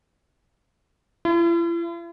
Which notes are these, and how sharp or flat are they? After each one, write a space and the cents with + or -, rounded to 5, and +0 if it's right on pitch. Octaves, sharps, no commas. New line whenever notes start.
E4 +45